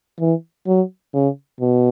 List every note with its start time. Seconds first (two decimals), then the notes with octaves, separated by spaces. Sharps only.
0.20 E3
0.67 F#3
1.14 C#3
1.61 B2